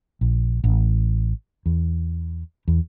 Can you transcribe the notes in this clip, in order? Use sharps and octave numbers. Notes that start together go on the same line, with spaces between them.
A#1
A1
E2
E2